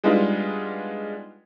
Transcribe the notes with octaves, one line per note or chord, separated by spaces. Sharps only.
G3 G#3 B3 D4 D#4 F4